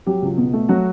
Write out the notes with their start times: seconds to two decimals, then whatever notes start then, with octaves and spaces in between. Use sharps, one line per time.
0.06 F#3 G4
0.22 C#2
0.38 B2
0.53 A3
0.69 F#3 F#4